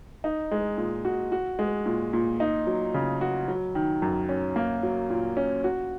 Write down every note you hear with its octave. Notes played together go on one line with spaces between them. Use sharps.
D#4
G#3
A#2
F#4
F#4
G#3
A#2
A#2
D#4
F#3
C#3
F#4
F#3
D#3
F#2
C#4
A#3
F#3
A#2
C#4
F#4